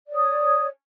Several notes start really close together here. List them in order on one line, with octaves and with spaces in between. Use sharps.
D5 C#5 D#6